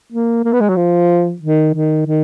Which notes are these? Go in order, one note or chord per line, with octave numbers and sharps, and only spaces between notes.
A#3
A#3
B3
G#3
F#3
F3
D#3
D#3
D#3